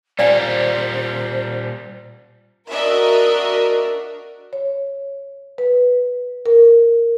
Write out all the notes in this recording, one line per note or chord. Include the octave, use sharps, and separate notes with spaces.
A#2 G3 C5 D5 F5 G#5
D4 F#4 A#4 D#5 E5
C#5
B4
A#4